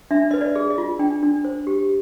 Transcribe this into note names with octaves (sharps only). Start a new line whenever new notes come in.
D4 E5
B4 D#5
D5
G#4
D#5
F4
D4 G5
D4
C5
G4